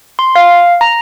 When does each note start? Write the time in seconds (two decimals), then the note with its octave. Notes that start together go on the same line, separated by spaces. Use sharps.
0.19 C6
0.36 F5
0.81 A#5